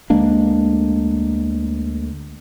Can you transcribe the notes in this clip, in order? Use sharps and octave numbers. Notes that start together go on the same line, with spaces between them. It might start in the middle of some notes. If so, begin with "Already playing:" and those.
D2 G#3 A#3 D4